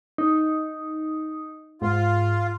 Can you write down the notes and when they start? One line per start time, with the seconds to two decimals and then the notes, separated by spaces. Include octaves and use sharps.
0.18 D#4
1.82 G#2 F4